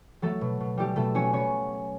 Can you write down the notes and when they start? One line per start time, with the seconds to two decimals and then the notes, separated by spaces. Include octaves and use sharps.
0.22 F#3 A3 A4
0.41 B2
0.60 B2
0.77 G3 A3 G4
0.96 B2 A3 A4
1.15 F#3 C#4 C#5
1.33 B3 C#4 C#5